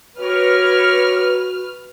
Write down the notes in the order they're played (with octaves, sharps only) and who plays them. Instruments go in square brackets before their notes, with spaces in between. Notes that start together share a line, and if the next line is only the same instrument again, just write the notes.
[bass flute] F#4 [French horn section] G4 A#4 C#5 [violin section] B4 F6